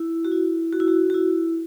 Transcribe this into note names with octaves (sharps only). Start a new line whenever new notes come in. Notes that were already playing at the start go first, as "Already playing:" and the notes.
Already playing: E4
F#4
E4
F#4
E4
F#4
F#4
E4